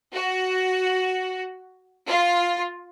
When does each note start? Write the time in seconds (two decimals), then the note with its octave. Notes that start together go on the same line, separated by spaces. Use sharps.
0.14 F#4
2.07 F4